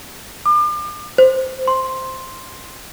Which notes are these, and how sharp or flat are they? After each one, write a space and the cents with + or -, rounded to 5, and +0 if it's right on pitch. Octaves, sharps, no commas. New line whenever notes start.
D6 +40
C5 -5
C6 +5